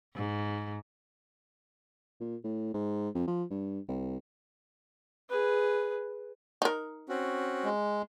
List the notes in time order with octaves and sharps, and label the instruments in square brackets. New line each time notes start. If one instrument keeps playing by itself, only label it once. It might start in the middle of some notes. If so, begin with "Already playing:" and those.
[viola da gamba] G#2
[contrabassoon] A#2
A2
G#2
F2
F3
G2
C2
[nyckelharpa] G#4 B4
[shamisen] D#4 A#4
[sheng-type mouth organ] C4 C#4 F#4
[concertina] G#3